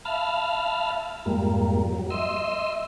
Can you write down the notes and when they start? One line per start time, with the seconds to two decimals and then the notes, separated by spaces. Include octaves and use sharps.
0.05 E5 F5 A5 B5 F6
1.26 F2 G#2 G3 A#3
1.93 F#3
2.10 D#5 E5 C6 E6